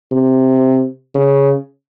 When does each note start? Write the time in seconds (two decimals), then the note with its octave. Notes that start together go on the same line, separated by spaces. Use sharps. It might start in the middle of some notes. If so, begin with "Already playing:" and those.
0.11 C3
1.15 C#3